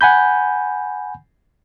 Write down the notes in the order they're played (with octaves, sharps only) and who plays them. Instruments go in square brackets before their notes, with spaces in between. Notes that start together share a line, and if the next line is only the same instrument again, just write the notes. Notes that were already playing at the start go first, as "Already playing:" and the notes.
[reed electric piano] F#5 G#5 B5 G6